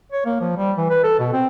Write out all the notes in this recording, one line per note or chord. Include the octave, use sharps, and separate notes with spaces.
C#5
A#3
F3
G3
E3
B4
A4
B2
C4